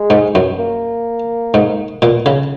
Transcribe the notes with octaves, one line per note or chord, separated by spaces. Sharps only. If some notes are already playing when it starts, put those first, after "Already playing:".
Already playing: G#3
G#2
F#2
A#3
G#2
A#2
C#3